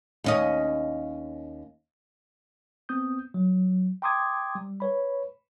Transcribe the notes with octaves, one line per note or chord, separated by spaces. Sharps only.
D#2 C#4 D#5
B3 C4 D#6 G6
F#3
G5 A#5 C6 D6 D#6 G#6
G3
B4 C#5 B5